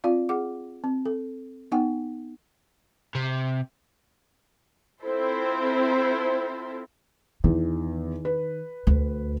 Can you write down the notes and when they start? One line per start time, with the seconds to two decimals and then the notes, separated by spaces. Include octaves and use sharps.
0.04 C4 F4 D5 F5
0.29 G#4 F#5 D6
0.84 C4
1.06 A4
1.72 B3 D#4 F#5 G5
3.15 C3
5.02 C4 E4 F4 A4 C5
7.44 E2 D#3
8.25 B4
8.87 D2